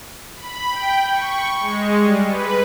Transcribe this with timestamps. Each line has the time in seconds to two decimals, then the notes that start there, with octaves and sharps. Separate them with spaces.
0.35 B5
0.70 G5
1.10 C#6
1.60 G#3
2.00 G3
2.28 B4